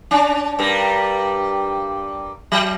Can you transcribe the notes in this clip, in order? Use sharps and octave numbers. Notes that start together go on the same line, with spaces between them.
C#4 D4
G2 G3 A#4
F#3